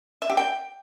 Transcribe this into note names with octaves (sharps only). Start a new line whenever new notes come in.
E5
G4
G5